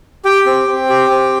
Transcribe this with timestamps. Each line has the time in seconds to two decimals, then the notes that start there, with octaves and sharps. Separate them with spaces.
0.25 G4 G5
0.46 C4
0.68 C4
0.89 G4
1.11 C4